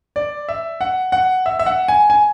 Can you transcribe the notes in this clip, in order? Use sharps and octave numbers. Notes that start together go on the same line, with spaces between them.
D5
E5
F#5
F#5
E5
E5
F#5
G#5
G#5